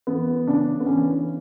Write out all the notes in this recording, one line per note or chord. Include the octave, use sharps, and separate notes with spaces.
E3 B3
C#3 D4
B3
E3 C#4